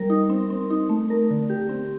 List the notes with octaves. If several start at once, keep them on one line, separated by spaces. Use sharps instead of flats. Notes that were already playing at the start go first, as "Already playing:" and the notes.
Already playing: G3 A#4
D#4
C4
C4
D#4
A3
A#4
D3
G4
C4